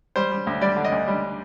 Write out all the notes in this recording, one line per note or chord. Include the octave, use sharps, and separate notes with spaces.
G3 C5
G3
D2
G3 D5
D3
D#5
D2
G3